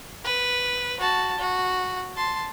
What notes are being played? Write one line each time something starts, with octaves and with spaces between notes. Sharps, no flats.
B4
F#4 A5
F#4
A5 C6